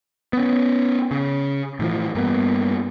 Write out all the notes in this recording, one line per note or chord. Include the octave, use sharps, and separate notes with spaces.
B3 C#4
C#3
A2 E3 F3
G2 A#3 B3